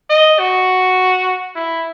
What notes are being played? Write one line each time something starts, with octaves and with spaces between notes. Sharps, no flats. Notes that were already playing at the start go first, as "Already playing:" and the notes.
D#5
F#4
E4